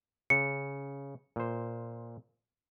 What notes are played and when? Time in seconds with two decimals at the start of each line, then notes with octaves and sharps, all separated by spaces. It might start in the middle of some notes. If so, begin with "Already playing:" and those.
0.30 C#3 C#7
1.36 A#2 C5